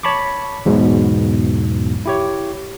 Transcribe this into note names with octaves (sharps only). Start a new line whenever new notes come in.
C#5 A5 B5 C#6 D6
E2 G#2 B2 F#3
E4 G4 C#5